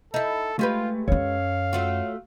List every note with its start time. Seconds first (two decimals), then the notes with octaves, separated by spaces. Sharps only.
0.14 D#4 E4 A4
0.59 G#3 A3 F4 G4 B4
1.08 F#2 C#4 A4 C#5 F5
1.73 A3 F4 F#4